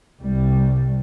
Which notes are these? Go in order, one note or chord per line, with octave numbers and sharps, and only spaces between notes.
C2 G3